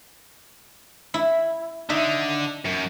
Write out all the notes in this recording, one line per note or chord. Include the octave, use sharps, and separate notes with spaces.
E4
D3 D#4 E5
F#2